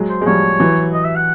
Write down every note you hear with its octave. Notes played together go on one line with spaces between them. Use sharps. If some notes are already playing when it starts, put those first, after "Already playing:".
Already playing: F#3 G#3
C5
G#3
F3 G3 C#5
E3 F#3
D#5
E5
F#5